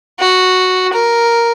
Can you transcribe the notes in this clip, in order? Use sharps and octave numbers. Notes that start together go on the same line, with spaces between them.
F#4
A#4